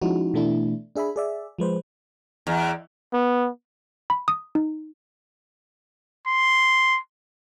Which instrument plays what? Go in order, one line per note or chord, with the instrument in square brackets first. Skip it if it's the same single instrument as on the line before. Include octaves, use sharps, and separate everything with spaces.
[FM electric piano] F3 G#3 C#4 D#4 E4 F#4
B2 E3 A3 D4 E4
D4 G#4 E5 G#5 B5
G#4 D5 E5
F3 G#3 B4 C5
[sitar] E2
[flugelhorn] B3
[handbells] B5
D#6
D#4
[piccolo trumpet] C6